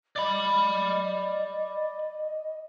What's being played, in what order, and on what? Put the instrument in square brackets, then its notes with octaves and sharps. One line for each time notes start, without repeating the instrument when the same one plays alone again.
[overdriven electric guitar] D5 B5 [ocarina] D#5